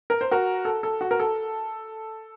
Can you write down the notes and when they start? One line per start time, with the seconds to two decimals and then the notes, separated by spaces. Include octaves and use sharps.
0.10 A#4
0.21 C5
0.31 F#4 A#4
0.65 A4
0.83 A4
1.01 F#4
1.11 A#4
1.20 A4